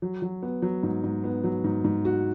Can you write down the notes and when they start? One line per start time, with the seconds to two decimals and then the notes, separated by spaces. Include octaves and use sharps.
0.02 F#3
0.22 F#3
0.43 B3
0.62 F#3
0.83 G#2
1.04 G#2
1.24 B3
1.44 F#3
1.64 G#2
1.84 G#2
2.05 F#4